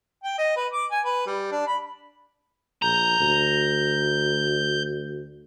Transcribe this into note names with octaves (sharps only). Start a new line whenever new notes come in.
G5
D#5
B4
D6
G#5
B4
G3
D4
B5
A#1 A#5 G6
D2